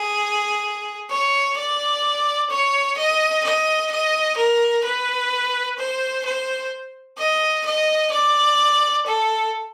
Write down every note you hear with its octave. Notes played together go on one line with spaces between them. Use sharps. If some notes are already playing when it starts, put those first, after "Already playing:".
Already playing: G#4
C#5
D5
C#5
D#5
D#5
D#5
A#4
B4
C5
C5
D#5
D#5
D5
A4